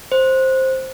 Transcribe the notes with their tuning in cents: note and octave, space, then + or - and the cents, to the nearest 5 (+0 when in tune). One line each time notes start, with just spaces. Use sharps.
C5 +5